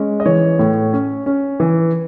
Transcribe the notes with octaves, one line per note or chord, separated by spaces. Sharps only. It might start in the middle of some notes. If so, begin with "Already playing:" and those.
Already playing: G#3 C#4
D#5
E3 C#5
A2
C#4
C#4
E3